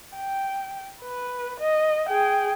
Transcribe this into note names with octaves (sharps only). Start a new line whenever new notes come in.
G5
B4
D#5
G#4 G5